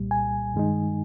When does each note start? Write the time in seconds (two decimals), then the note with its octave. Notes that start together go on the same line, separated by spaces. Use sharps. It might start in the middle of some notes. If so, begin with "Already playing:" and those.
Already playing: C2 A#2 G3
0.11 G#5
0.54 G2 D#3 G#3 D#4